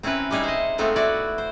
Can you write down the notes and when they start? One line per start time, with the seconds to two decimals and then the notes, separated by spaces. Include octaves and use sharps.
0.03 C4 C#4 E4 A#4 B4
0.31 G3 G#3 D#4 E4 G#4
0.44 C5 D#5
0.78 G#3 A3 B3 C4 D#4 F4
0.96 E4 F#4 B4 D5
1.38 C5